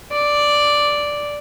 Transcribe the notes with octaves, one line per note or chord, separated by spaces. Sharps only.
D5